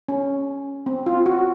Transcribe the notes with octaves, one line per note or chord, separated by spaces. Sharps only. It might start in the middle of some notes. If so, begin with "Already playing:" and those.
C#4
C4
F4
F#4